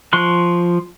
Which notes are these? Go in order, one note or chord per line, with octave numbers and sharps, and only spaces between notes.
F3 C6 C#6 F#6